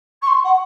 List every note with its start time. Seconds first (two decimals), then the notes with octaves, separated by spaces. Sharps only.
0.22 C#6
0.27 C6
0.44 F#5